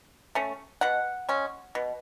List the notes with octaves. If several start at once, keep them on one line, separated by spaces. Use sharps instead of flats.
A3 C#4
B2 F#5
G#3 C#4
B2